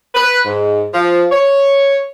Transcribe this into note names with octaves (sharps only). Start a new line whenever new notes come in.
B4
G#2
F3
C#5